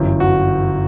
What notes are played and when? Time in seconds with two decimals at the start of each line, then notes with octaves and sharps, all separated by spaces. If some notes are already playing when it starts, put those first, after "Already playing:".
Already playing: G1 F#2 E3
0.20 F#4